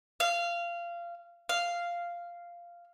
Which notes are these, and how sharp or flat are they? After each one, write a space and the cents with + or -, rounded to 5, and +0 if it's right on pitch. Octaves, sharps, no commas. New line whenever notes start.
F5 -20
F5 -5